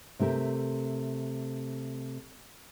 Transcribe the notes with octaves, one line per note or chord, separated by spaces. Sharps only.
C3 A3 G4 A#4